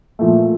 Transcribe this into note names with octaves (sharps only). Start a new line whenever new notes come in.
A#2 F3 A3